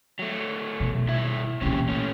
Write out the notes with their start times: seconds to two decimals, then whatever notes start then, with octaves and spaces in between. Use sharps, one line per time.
0.19 F#3 A3
0.80 B2 D#3
1.08 G2 E4 E5
1.61 A#2 E3 C4 C#4 G4
1.89 A3 C#4